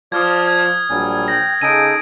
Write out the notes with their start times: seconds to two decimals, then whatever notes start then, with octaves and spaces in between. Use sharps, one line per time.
0.12 F3 D5 D#6 F6 G#6
0.48 G#6
0.90 A#1 F#3 G3 G#5
1.28 G5 A#6
1.62 C#3 D#4 G#4 A4 D7 D#7